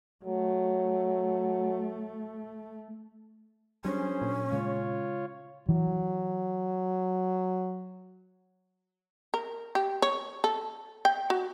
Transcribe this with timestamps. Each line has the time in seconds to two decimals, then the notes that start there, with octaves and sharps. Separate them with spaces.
0.25 F#3 A3
3.84 F#3 G3 C#4 D4 G#4 C5
4.22 A#2
4.52 C#3 G#3 F4 C#5
5.69 E3 F#3
9.34 A#4
9.75 G4
10.02 C#5
10.44 A4
11.05 G5
11.30 F#4